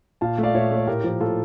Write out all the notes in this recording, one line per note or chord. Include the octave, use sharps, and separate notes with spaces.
A#2 F5 A5
A3
D5 F5
A#2 C#5 E5
A3
C#5
A2 G4 A#4
F3 A#3
A2 F4 A4